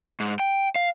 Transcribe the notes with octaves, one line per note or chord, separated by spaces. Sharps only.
G#2
G5
F5